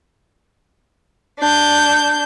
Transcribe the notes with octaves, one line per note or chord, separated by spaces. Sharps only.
D4 G6